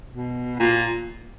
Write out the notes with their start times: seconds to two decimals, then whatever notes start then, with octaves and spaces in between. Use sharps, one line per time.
0.13 B2
0.60 A#2